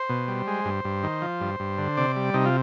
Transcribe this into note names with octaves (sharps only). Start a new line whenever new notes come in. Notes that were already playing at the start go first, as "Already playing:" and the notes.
Already playing: C5
B2
G3
G#3
G2
G2
D#3
F3
G2
G2
D3
C3 D5
G3
C3 D#4
F4